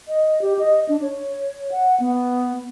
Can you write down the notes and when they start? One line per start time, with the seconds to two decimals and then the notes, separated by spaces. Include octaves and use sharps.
0.08 D#5
0.42 G4
0.59 D#5
0.89 D4
1.02 C#5
1.72 F#5
2.00 B3